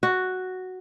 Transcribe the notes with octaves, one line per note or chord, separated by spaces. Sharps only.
F#4